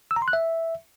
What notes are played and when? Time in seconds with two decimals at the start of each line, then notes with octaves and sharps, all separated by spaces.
0.11 E6
0.16 A#5
0.22 C6
0.28 F#6
0.33 E5